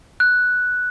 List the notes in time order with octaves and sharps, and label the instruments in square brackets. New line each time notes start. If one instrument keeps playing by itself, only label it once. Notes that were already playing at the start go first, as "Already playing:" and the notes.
[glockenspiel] F#6